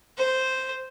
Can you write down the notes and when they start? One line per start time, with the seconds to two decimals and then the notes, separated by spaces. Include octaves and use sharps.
0.17 C5